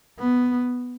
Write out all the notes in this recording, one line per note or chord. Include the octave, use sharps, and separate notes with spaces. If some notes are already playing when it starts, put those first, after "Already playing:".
B3